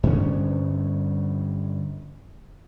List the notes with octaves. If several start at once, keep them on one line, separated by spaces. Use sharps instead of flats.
G2 D3 C#4